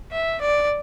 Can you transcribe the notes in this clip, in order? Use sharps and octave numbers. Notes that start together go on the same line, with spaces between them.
E5
D5